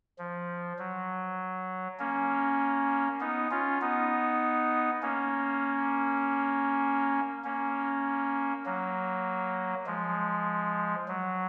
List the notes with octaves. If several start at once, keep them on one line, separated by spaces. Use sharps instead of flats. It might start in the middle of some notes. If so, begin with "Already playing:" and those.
F3
F#3
A#3 C#4
B3 D#4
C#4 F4
B3 D#4
A#3 C#4
A#3 C#4
F#3 A#3
F3 G#3
F#3